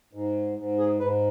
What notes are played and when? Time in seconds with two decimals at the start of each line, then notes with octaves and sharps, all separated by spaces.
0.13 G#2
0.57 G#2
0.78 G#4
1.00 G#2 B4